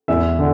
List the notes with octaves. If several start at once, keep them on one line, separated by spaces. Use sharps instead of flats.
E2 E5
D3